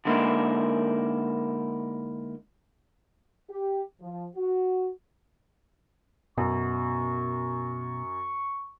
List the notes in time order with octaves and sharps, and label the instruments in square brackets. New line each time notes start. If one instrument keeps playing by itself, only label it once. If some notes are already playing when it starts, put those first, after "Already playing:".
[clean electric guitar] D3 G#3 A#3 D#4 E4 A#4
[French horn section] G4
F3
F#4
[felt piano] F#2 [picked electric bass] B2 [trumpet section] C#6